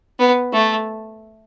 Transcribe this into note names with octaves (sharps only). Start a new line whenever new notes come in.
B3
A3